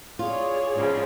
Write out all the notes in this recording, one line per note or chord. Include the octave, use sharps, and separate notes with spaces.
F4 G#4 C#5 D5
G#2 C#3 F3